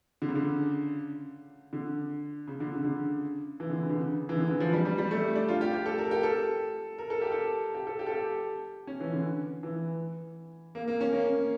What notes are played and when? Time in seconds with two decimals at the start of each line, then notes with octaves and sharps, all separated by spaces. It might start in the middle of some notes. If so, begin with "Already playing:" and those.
0.22 D3
0.29 C#3
0.35 D3
1.73 D3
2.48 C#3
2.60 D3
2.73 C#3
2.85 D3
3.60 E3
3.70 D3
3.80 C#3
3.89 D3
3.98 C#3
4.29 E3
4.35 D3
4.48 E3
4.60 F3
4.73 G3
4.85 G3
4.98 G3
5.11 A3
5.35 D4
5.48 F4
5.61 G4
5.74 G4
5.86 A4
5.98 A#4
6.11 G4
6.23 A4
6.98 A#4
7.10 A4
7.21 G4
7.32 A4
7.75 G4
7.87 A4
7.99 G4
8.07 A4
8.12 G4
8.87 C#4
9.00 E3
9.13 D3
9.63 E3
10.75 A#3
10.88 A#3
11.01 C#4
11.13 A#3